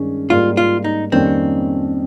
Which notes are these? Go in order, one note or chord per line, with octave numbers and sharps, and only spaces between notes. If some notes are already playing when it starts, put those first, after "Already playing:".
Already playing: G2 D#3 G#3 C#4
G#2 G3 A#3 F4
F4
D#4
F2 D#3 G3 A#3 C4 C#4